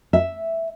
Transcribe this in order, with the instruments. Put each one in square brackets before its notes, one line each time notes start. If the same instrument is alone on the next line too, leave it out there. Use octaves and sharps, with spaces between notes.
[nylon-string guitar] E5